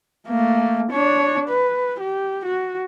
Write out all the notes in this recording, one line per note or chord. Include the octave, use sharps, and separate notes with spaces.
A3 A#3
D4 C#5
B4
G4
F#4